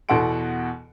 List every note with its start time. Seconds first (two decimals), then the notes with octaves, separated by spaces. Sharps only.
0.09 E2 B2 A4 F#5 C6 D7